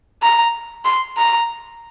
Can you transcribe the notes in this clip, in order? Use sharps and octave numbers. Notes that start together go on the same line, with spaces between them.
A#5
C6
A#5